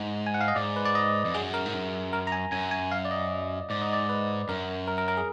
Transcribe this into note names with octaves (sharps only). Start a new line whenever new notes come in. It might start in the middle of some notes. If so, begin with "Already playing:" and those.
Already playing: G#2
G#5
F#5
F5
D#5
G#2 D5
B4
D5
D#5
F2
F#2 G#4
A#4
G#2
F#2
A#4
A#5
G#5
F#2 G#5
G#5
F5
D5
D#5
G#2 D5
D#5
D5
B4
F#2 A#4
A#4
A#4
A#4
G#4